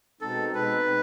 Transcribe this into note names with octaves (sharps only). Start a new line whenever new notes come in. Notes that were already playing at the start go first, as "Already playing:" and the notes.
B2 G#3 C4 D#4 A4
B2 G#3 C4 D#4 B4